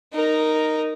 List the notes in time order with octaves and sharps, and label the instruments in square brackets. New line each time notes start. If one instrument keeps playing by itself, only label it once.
[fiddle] D#4 A#4